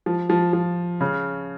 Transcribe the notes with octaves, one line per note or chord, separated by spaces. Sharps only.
F3
F3
F3
C#3